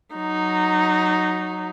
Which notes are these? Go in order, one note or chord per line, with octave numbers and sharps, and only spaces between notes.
F#3 D#4